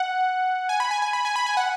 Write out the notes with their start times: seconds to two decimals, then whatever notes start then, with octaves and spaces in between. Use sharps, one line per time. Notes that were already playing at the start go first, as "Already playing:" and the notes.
Already playing: F#5
0.69 G#5
0.80 B5
0.91 G#5
1.02 G#5
1.13 B5
1.25 G#5
1.36 B5
1.46 G#5
1.57 F#5